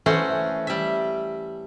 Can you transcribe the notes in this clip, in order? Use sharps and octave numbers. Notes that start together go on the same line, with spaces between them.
E3 A3 C#4 F#4 C5
G3 E5